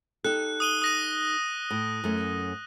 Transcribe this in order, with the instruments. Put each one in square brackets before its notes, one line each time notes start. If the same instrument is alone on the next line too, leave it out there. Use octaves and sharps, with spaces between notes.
[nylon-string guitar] D#4 G4 A4 [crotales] F#6
[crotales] D#6 D#7 G7
D#6 A#6 D#7
[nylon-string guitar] A2
F#2 A3 C#4